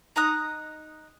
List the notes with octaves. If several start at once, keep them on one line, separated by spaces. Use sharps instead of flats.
D#4 A#5 D#6 F#6